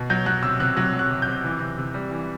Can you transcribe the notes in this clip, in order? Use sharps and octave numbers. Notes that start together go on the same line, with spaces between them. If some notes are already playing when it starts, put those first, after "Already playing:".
Already playing: B2
F#3 G6
F#3 F#6
C3 E6
C3 F#6
F#3 F#6
F#3
F#6
C3
G6
C3
E3
C3
C3
G3
E3